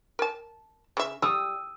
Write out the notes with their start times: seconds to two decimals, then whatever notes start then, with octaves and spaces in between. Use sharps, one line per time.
0.19 A#4 A5
0.97 C#3 E5
1.22 G3 D#6 E6